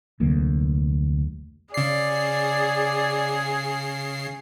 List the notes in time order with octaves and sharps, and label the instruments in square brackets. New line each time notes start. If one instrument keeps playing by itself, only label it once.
[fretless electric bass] F1 D2 F#3 A#3
[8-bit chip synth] C#3 C7 [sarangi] G#4 [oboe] D5